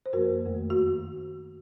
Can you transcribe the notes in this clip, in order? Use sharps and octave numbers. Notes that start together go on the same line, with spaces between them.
C5
F#2 F3 A#3 F#4 A#4
F2 D#3 A3
F#4